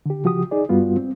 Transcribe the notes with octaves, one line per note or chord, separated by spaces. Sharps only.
D3 G4
C#3 F3 F#4 G4 D#6
D#4 G#4 D5
G2 G3 B3 F4 F#4
C4